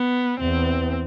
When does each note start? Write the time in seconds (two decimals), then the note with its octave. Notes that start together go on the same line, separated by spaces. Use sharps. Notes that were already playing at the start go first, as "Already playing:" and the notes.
Already playing: B3
0.39 E2 C4